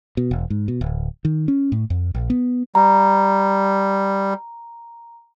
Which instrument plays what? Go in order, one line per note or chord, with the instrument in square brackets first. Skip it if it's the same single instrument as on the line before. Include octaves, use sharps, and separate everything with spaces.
[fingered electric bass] B2
E1
G#2
B2
D1
D#3
C#4
A2
F2
A#1
B3
[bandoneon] G3 [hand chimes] A#5